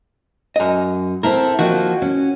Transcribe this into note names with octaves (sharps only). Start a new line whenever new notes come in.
F#2 D#5
C4 E4 A4 A#4
D#3 F3 A#3 F#4
C#4